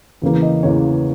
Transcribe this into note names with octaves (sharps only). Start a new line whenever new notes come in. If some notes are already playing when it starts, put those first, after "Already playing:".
E2 C#3 E3 A#3
D#5
E2 C#3 E3 A#3 C#5